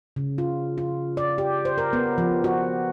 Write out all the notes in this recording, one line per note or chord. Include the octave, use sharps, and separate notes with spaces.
C#3
F4
F4
D5
G4
C5
A#4
B3
F3
F#4